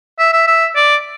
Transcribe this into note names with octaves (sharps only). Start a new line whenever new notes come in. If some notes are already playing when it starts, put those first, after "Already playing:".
E5
E5
E5
D5